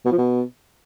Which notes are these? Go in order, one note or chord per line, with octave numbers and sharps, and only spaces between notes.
B2
F3
B2